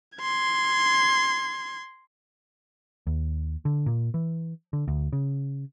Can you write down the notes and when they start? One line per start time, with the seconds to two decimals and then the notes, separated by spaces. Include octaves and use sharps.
0.18 C6 G#6
3.07 D#2
3.65 D3
3.86 A#2
4.14 E3
4.73 D3
4.88 D2
5.13 C#3